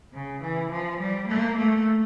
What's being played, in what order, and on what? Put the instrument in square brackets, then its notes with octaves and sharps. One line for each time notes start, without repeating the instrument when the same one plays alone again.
[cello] C#3
E3
F3
G3
A#3
A3